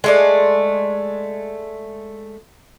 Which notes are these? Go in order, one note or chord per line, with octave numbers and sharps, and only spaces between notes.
G#3 A3 D5